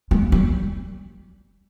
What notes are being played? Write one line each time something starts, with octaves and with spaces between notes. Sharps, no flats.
G#3
G3